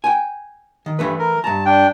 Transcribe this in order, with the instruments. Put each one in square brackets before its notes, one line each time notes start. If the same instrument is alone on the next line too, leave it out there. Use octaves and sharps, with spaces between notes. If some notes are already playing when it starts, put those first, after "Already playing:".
[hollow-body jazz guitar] G5 G#5
D#3
[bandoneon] G2 [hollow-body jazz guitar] E3 A3 B4
[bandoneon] A#4
[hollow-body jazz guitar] G2 A#5 [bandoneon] A5
[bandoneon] D4 G5